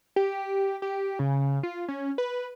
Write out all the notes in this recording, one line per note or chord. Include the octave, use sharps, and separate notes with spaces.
G4
G4
C#3
F4
C#4
B4